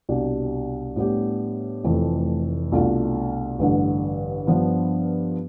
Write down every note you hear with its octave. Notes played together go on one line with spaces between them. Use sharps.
C2 B2 G3 D4 G4
A2 G3 B3 D4 G4
F1 F2 E3 A3
C2 B2 A3 D4 F4
A1 G2 D3
G2 F3 B3 D4 F4